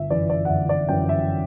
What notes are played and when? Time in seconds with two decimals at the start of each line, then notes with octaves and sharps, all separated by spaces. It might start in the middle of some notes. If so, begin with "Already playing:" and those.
Already playing: G1 E5
0.10 F#2 E3 D5
0.30 D5
0.45 F#5
0.49 G1 E5
0.69 D5
0.89 F#2 E3 G5
1.09 E5